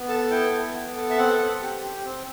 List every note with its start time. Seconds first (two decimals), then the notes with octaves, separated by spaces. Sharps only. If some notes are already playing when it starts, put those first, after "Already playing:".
Already playing: B3
0.08 A4 A5
0.30 E4 G5
0.52 B3
0.74 B3
0.96 A4
1.10 E5
1.17 C4 F#5
1.39 C4
1.62 G4
1.82 G4
2.05 C4